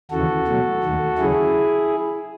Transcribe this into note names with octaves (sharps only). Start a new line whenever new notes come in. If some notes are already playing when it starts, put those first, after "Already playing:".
D#2 C#3 E3 F#4 A4
B2 F#3 A3
D#2 D#3 A3
D#2 C#3 F#3 E4 G#4